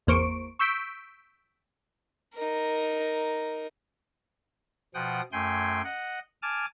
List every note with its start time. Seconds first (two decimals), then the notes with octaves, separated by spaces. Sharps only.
0.07 G#1 E2 A#3 C5 C#6 D7
0.59 C#6 E6 G6 B6 D7
2.35 D#4 A#4
4.94 B2 F3 F#5 G5 D#6
5.32 F#2 A3 G5 G#5 C6
5.85 D#5 F#5
6.42 G#5 A5 D6 F6